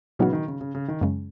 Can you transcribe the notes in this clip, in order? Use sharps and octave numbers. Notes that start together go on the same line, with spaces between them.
A#2 C#3 E3 F#3 B3 D#4 F#4
D#3
C#3
C#3
C#3
D#3
F#2 C#3 G#3